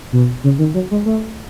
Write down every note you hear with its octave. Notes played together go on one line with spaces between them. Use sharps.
B2
C#3
D#3
F#3
G#3
A3